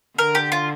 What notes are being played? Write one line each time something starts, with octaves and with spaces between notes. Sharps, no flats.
D3 A#4
G4
F4